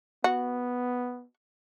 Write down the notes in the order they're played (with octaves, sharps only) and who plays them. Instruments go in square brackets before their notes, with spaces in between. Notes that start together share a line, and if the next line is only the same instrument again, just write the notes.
[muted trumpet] B3 [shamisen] F#4